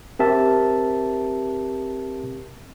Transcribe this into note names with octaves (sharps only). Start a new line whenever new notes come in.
C4 G4 A#4 E5 A5